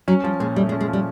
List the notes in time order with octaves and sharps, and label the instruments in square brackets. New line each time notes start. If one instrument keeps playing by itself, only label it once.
[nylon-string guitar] F#3 [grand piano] C#4
[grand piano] F3 [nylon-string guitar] G3
[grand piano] A#2 [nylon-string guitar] G#3
[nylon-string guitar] G3 [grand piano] A3
[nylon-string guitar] G#3
[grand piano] C#4
[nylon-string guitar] G#3
[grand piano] F3
[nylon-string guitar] G3